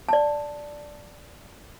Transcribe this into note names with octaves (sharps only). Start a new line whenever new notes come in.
D5 A5